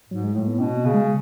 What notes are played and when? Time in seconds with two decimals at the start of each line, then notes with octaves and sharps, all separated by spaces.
0.09 G#2 F#3
0.23 G#3
0.34 A2 A3
0.48 B3
0.60 B2 C#4
0.77 B3
0.85 C#3
0.94 G#3